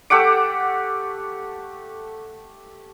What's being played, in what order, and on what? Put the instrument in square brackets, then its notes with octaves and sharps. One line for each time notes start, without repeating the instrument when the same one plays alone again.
[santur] A3 G4 F#5 D6